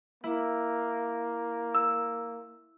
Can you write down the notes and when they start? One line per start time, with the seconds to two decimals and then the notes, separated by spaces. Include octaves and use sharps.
0.24 A#3 E4
1.74 E6